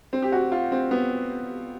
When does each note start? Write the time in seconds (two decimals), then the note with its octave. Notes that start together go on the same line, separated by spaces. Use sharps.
0.13 C4
0.22 G4
0.32 F#4
0.52 F4
0.72 C4
0.91 B3